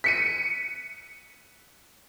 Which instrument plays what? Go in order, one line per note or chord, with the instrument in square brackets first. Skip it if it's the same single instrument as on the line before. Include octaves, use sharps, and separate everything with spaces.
[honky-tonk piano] B6 C#7 D#7